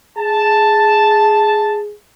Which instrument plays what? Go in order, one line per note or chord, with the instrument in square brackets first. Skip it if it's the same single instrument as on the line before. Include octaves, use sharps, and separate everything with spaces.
[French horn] G#4 [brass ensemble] A5